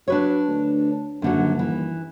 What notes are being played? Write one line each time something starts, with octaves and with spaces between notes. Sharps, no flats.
F#3 D4 B4 C#5
D2
D#1 F#2 D3 F#3
E3